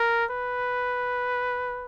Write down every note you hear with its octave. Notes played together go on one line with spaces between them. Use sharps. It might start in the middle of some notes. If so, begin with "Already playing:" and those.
Already playing: A#4
B4